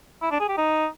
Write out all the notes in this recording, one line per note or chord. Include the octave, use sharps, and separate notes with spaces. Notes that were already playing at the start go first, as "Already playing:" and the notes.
E4
D4
G#4
G4
D#4